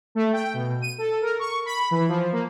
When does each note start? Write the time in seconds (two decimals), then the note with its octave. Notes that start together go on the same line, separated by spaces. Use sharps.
0.15 A3
0.33 G5
0.54 B2
0.82 D#7
0.98 A4
1.22 A#4
1.39 C#6
1.66 B5
1.91 E3
2.09 F3
2.32 A#3